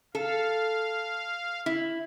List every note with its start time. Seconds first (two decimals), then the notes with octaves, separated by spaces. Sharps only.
0.15 A4 F5
1.66 E4